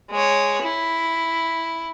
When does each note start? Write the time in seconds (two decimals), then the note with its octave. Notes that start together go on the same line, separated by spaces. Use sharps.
0.11 G#3 C#5
0.63 E4